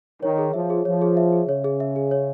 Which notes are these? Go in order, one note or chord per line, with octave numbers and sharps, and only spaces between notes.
D#3 C#5
G#4
F3 E5
G#4
F3 C#5
G#4
E5
G#4
C#3 C#5
G#4
E5
G#4
C#5